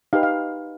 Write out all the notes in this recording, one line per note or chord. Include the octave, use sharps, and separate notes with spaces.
D#4 G4 B4 F5
F5